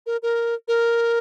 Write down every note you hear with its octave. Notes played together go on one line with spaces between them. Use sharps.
A#4
A#4
A#4